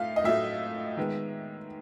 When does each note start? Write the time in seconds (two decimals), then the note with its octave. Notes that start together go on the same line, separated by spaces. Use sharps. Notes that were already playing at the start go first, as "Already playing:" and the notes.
Already playing: A2 A3 F5
0.16 D#5
0.24 A2 F#3 A3 E5
0.97 D#3 G#3 B3